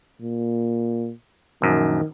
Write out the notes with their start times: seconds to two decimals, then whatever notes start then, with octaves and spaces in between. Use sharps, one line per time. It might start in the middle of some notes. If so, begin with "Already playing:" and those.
0.21 A#2
1.62 A#1 F#2 D#3